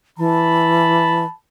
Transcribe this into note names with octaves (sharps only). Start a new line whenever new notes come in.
E3 A5 B5